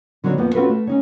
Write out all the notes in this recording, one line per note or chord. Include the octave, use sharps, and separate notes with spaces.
D3 F#3 G3 C4 D#4 C#5
F2 F3 A#3 B3
C4 C#4 F4 F#4 A4 B4
A3
C#4 D#4 C#5